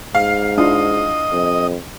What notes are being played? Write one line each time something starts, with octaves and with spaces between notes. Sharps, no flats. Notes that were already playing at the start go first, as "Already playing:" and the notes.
G#2 F5
D4 E4 F4 D#5
F2